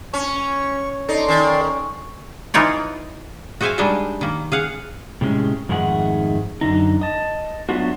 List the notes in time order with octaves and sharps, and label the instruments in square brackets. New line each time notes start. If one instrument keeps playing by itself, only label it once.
[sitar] C#4 [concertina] C#6
[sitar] D#4 [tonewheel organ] A4 D5 C6
[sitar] D#3 [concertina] C#4
[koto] E3 D#4 F4 C#5 D5
F#4 G#4 C5 E5 F5 G#5
G3 G#3 D4 D#4 G#4 E5
D#3 A#3
G#4 F5 F#5
[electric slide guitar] A2 C3 G#3 C#4
F2 G#2 D#3 A3 G#4 F#5
F#2 D3 D#4
D#5 A5
F#3 A3 B3 D4 F4 F#4